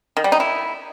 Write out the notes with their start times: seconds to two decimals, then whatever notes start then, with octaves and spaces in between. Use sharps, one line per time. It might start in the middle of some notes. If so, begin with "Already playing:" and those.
0.17 D#3
0.24 G3
0.32 D#4
0.40 E4